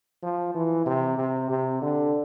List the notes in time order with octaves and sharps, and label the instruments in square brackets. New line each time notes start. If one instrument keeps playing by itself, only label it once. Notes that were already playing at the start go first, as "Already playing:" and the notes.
[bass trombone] F3
E3
C3
C3
C3
D3